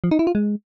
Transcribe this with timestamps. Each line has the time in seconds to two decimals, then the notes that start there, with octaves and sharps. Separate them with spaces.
0.04 F3
0.11 D#4
0.19 E4
0.27 F4
0.35 G#3